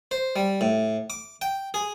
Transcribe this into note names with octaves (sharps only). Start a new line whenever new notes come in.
C5
G3
A2
D6
G5
G#4